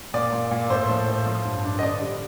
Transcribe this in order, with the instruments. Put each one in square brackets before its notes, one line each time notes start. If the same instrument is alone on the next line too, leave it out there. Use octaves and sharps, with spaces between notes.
[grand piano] A#2 D5
A#2
A#2
A2 C5
F3
A2
F3
G2
D4
D#5
D3 D5
G3